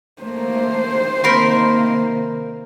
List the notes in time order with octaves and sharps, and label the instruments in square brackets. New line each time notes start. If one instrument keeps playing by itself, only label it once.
[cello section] A3 A#3 [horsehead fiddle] C5
[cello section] C3 D#3 A#3 [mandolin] A#4 B5 C6